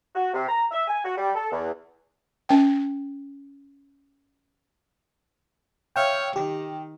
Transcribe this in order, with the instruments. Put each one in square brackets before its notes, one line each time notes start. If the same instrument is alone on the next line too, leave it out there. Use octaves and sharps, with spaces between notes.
[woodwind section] F#4
C3
A#5
E5
G#5
F#4
G3
A4
E2
[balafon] C#4 G5
[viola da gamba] C#5 [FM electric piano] E5 F5 G5
[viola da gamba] D#3 [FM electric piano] G4